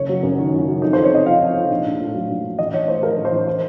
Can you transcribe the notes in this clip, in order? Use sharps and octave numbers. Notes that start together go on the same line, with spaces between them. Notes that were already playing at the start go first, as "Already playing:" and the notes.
Already playing: F#1 C#5
F#3
F#2
D#3
F#1
F#3
F2 D#4
F2 C5
C#5
C3 D#5
F3 F5
F2
F2
A#1
A#1
A2
F#3
A#1
A#1
A1 D#5
A1 C#5
A2 C5
F3 A#4
A1
C5
A1
C5